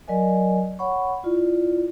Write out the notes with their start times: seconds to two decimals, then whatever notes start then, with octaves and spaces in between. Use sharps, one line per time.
0.08 F#3 A#4 D5 D#5 G#5
0.79 C#5 F#5 B5 C#6
1.23 E4 F4 D5